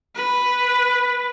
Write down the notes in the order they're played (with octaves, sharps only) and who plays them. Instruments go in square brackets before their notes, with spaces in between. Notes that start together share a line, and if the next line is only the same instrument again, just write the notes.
[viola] B4